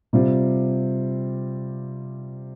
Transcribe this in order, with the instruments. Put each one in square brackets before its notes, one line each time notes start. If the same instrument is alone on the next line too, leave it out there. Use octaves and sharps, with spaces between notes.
[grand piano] C3 G3 C4 F4